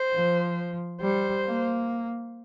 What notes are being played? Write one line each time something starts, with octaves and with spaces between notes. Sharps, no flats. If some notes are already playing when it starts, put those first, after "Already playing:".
Already playing: C5
F3
G3 C5
A#3